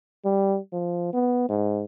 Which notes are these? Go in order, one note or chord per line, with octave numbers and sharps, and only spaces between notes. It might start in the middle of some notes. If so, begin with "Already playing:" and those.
G3
F3
B3
G#2